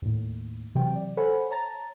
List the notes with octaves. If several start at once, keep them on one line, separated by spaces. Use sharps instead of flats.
D#2 A2
C3 E3 F#3 G5
D5
A4 C5 C#5 F#5 G#5 B5
C#5 A5 A#5 A6